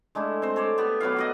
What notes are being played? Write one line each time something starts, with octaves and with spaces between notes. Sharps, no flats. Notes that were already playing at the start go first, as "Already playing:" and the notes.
G#3 A3 D4 E4
C4 C5
A4 C#5 D5
B3 G4 D5
F#3 B3 E4 F5
F#4 D5 D#5